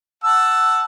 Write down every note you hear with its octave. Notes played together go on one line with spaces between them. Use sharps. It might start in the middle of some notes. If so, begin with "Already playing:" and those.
F#5 A5 E6